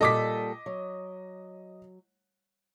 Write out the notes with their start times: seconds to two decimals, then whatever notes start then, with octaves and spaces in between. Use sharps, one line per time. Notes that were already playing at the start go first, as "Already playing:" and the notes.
0.01 A#2 G3 A4 D#5 D6 B6
0.66 F#3